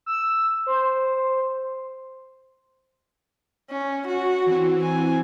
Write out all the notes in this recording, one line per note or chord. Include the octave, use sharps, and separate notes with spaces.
E6
C5
C#4
F#4
E3 C4
G#5